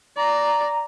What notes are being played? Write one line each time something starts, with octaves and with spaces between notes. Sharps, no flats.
D5 A#5